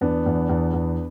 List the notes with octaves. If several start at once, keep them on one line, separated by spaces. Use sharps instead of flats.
E2 B3 D4
E2
E2
E2